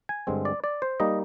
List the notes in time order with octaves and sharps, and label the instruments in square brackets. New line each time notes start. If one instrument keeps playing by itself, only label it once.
[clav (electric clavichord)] G#5
G2 D3 G#3 C4
D5
D5
C5
G3 A#3 D#4 D#5